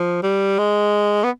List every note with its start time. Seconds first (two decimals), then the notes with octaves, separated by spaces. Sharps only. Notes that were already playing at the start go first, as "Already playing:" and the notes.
Already playing: F3
0.23 G3
0.58 G#3
1.23 B3